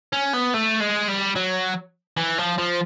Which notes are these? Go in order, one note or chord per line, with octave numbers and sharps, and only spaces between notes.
C#4
B3
A3
G#3
G3
F#3
E3
F3
F3